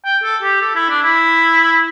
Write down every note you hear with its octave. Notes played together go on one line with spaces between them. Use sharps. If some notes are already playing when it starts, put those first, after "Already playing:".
G5
A4
G4
A4
E4
D4
E4